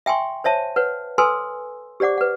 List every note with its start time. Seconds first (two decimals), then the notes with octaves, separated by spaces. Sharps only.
0.06 E5 G5 G#5 C6 C#6
0.44 C5 C#5 E5 A5
0.76 B4 C#5 F#5
1.18 A4 B4 G#5 C6 E6
2.00 G4 C5 D5 F#5 D6
2.18 B4 F#5